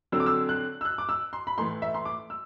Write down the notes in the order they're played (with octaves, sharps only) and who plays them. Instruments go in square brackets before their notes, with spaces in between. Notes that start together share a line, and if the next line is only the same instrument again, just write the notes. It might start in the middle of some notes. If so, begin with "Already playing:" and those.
[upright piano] D3 F#3 C4 E6
D6
E6
F#6
E6
F#6
D6
E6
C6
B5
A2 E3 A3 C6
E5
C6
D6
E6